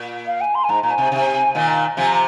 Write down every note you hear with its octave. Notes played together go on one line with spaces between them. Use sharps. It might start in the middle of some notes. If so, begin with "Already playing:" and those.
Already playing: A#2
F5
G#5
C6
G#5
G#2 A#5
A#2 A#5
G#5
C3
C3
A#2 D#3
C3 F3 G#5
A#5